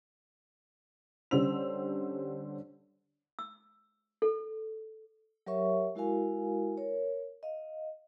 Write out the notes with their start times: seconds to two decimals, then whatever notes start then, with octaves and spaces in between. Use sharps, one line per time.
1.31 D3 G3 C#4 C5 E6 F7
3.39 E6
4.22 A4
5.46 F#3 G4 A#4 C#5 E5 C#6
5.95 G#3 E4 F#4 A#4 F5 G#5
6.78 A#4 C#5
7.43 D#5 F5